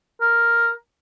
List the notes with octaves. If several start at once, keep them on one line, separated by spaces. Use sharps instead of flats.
A#4